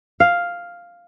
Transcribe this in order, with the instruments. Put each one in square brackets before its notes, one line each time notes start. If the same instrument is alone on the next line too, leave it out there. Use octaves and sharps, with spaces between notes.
[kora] F5